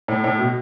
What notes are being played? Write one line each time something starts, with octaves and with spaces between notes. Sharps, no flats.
A2
A2
B2